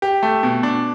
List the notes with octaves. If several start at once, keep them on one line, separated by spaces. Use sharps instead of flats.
G4
A3
B2
D4